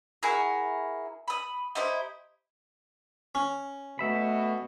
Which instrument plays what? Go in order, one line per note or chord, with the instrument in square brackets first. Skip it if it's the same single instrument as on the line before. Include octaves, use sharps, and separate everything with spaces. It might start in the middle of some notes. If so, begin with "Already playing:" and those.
[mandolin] E4 F#4 G#4 A#4
B5 D#6
D#4 E4 G4 C5
[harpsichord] C#4
[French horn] B2 [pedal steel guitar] A3 E5 B5